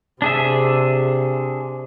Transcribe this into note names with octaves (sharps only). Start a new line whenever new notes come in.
C3 D4 G#4 E5